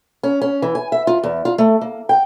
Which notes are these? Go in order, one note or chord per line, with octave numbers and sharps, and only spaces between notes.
C#4
C#4
E3
G#5
E5
F4
E2
F4
A3
A#3
G5